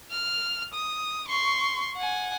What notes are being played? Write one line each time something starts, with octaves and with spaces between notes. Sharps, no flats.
F6
D#6
C6 C#6
F#5 G#5